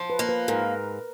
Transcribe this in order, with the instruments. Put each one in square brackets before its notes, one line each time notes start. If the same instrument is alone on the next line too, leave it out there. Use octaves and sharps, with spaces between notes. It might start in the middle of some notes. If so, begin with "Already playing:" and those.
Already playing: [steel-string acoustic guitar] F3
[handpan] B4
[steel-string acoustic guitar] A#3
[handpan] B4
[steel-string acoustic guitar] G#2 [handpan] A#4